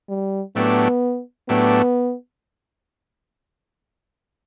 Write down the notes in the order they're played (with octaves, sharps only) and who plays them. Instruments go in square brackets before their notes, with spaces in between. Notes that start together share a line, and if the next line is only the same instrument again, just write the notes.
[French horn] G3
[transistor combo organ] A2 F#3 A3 D4 G4 [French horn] B3
[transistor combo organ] A2 F#3 A3 D4 G4 [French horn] B3